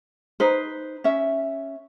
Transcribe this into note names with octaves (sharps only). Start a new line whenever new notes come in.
D#4 B4 C5
C#4 E5